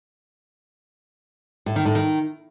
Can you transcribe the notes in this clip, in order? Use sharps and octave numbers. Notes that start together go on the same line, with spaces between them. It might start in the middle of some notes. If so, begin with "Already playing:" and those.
A2
D#3
A2
D#3